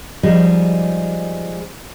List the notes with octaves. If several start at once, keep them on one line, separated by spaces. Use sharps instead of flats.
F3 G3 G#3 D#4